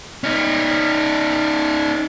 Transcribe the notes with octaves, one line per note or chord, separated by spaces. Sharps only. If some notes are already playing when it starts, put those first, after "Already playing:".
C#4 D#4